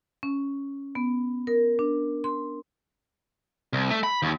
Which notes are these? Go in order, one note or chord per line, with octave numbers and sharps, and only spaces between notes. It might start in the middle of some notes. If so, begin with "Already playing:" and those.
C#4
B3
A#4
D4
C6
C2
A3
B5
D#2